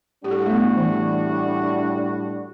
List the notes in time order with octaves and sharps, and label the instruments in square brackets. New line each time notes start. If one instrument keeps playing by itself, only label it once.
[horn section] A2 G3 D4 F#4 [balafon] G4
[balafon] A4
G4
A3
B3
E3